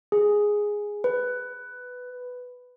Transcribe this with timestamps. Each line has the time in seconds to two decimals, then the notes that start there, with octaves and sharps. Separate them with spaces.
0.12 G#4
1.04 B4